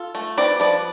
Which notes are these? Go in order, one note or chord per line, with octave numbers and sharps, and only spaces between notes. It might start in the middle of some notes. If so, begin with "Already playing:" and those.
Already playing: F4 A4
A3
C4 B4 D5
F3 B4 D5